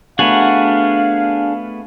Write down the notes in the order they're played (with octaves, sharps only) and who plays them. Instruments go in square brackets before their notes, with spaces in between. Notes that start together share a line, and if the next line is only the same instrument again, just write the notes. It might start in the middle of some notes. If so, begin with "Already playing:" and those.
[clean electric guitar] A3 B3 F#4 [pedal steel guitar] D4 G#4 F#5 [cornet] F5